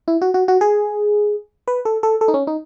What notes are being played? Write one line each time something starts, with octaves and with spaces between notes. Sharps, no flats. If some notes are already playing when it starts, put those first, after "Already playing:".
E4
F#4
F#4
F#4
G#4
B4
A4
A4
A4
D#4
C#4
D#4